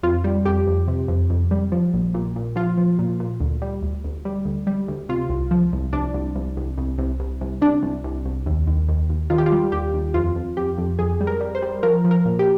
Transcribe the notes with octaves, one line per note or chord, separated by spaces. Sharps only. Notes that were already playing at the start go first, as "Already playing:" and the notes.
F2 F4
G3
F2 G4
F2
C3
F2
F2
G3
F3
A#1
A#2
A#2
F3 F4
F3
A#2
A#2
D2
G3
D2
D2
G3
D2
G3
D2
C3 F4
C2
F3
C2
C2 D4
C2
C2
C2
C2
C2
C2
C2
C3 D4
C2
C2
C2
D#2
D#2
D#2
D#2
D#3 F4
G4
F4
G3
D#2 G4
D#2
F2 F4
F2
F2 G4
F2
F2 G#4
G3
A#4
G3
C5
G3
F3 A#4
F3
A#4
A#2
G4